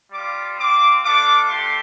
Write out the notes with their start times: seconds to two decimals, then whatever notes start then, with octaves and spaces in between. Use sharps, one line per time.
0.11 G3 F4 D6
0.57 C4 F4 D6
1.03 A3 D4 F4 D6
1.49 A3 D4 G4 C6